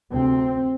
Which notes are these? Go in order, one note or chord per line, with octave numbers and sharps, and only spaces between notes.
D2 C3 C4